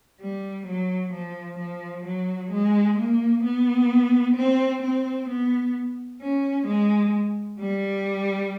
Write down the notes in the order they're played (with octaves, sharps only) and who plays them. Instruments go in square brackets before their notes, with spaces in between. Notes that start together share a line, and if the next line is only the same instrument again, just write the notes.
[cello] G3
F#3
F3
F3
F#3
G#3
A#3
B3
C4
C4
B3
C#4
G#3
G3